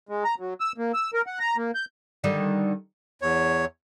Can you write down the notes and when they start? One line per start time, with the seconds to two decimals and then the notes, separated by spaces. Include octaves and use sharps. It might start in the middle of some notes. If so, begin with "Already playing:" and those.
0.09 G#3
0.24 A#5
0.39 F#3
0.60 E6
0.78 A#3
0.94 E6
1.14 A#4
1.27 F#5
1.39 A#5
1.57 A#3
1.75 G6
2.24 D3 D#3 G3
3.22 E2 C#5